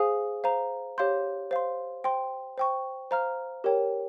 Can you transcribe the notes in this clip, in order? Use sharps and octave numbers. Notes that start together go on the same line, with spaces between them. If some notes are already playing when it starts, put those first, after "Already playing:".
Already playing: G#4 C5 F5 G#5 D#6
C5 F5 A#5
G4 C#5 F5 C6 G6
C5 F5 C6
C5 G5 C6
C5 G5 C#6
C5 F5 A#5 F6
G4 A#4 C#5 G5